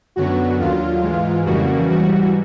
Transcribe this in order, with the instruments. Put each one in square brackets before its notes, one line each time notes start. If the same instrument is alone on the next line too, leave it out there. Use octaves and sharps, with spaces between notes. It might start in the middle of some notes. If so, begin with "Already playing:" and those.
[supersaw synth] F#2 D3 F#3 B3 F#4
D#2 D3 F#3 F4
G#2 E3 G#3
F2 C#3 E3 G3 A#3 F#4
G#2 E3 G3 F#4